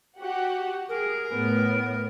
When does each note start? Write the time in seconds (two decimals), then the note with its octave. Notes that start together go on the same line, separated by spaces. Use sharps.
0.20 F#4 G4 F#5
0.89 G#4 A#4
1.33 A2 B3